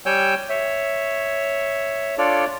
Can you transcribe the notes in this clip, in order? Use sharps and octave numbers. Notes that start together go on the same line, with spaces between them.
G3 C#5 G5 G#5 E6 G6
C#5 E5
D4 F4 A4 C#5 D5